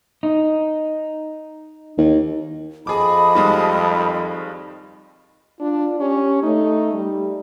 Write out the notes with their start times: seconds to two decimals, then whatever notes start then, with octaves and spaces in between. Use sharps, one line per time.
0.23 D#4
1.98 D#2
2.87 F2 G#4 D#5 A5 B5 D6 D#6
3.35 D#3 G3 G#3
5.60 D4 F4
6.00 C#4 G4
6.43 A3 D#4
6.94 G3